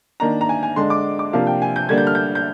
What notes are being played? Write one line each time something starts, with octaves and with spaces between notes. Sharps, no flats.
D#3 A#3 D4 A#5
A#5
G#5
G#5
D3 G#3 D4 C6
D6
D6
C3 F3 A#3 D4 F5
G5
G#5
G6
D3 G3 A#3 D4 G#6
G6
F6
G6
G6